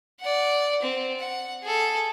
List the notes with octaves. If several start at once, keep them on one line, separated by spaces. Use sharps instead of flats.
D5 F#5
C4
F#5
G#4 A4